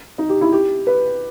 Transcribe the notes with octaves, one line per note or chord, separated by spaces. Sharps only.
D#4
G4
E4
G4
B4